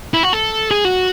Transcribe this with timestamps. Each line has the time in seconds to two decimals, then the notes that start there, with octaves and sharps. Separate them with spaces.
0.14 E4
0.23 F#4
0.33 A4
0.71 G#4
0.85 F#4